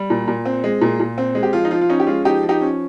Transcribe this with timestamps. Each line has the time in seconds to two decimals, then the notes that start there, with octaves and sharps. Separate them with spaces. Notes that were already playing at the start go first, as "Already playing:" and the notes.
Already playing: G3
0.10 A#2
0.28 A#2
0.45 C4
0.64 G#3
0.82 A#2
1.00 A#2
1.18 C4
1.35 G#3
1.43 G4
1.53 F3 F4
1.65 D#4
1.71 F3 F4
1.81 F4
1.89 C#4 D#4
2.00 G4
2.07 G#3 F4
2.25 F3 D#4 G4
2.43 F3
2.49 D#4 G4
2.61 C#4